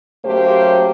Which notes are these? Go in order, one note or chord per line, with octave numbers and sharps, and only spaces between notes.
C#3 F#3 A3 A#3 G4 C5